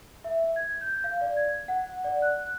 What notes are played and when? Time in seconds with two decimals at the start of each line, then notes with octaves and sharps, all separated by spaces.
0.24 E5
0.56 G#6
0.81 G6
1.04 F5
1.21 D5
1.37 G#6
1.68 F#5
2.04 D5
2.22 F#6